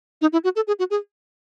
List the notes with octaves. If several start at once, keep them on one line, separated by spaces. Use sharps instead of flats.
D#4
E4
F#4
A4
G#4
F#4
G#4